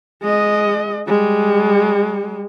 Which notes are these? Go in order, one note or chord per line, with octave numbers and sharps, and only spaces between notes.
G#3 D#5
G3 G#3